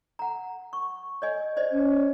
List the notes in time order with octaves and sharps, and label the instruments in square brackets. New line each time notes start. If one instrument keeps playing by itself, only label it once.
[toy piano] F#5 A#5
C#6
C#5 D#5 G#5
C5 D5 D#5
[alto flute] C#4